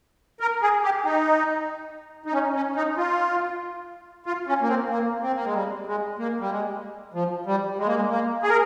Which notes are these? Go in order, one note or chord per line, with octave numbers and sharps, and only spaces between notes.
A#4
G#4
G4
D#4
D#4
C#4
C#4
D#4
F4
F4
C#4
A#3
C4
A#3
C4
A#3
G#3
G3
G#3
A#3
G3
G#3
F3
G3
G#3
A#3
G#3
A#3
G#4
A#4